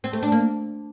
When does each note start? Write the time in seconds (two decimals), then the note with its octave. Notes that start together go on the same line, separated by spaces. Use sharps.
0.04 C4
0.13 A3
0.23 D4
0.32 A#3